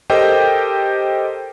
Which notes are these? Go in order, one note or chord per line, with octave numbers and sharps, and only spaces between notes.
G4 A4 A#4 C5 D#5 G5